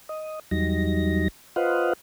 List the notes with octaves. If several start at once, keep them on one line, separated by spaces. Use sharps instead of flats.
D#5
E2 F#3 G3 D#4 A#6
F4 B4 C5 D#5 F5 F#5